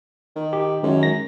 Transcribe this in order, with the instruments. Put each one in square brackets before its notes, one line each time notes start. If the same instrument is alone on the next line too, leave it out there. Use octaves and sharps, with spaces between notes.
[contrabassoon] D#3
[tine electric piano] G4
[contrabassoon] F#2 [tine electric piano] D#3 G#3 C#4
[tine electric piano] A#6